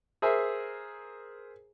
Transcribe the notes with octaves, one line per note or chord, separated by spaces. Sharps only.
G#4 A#4 C5 E5 G#5